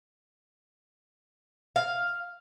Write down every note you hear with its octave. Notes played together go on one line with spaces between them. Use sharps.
F5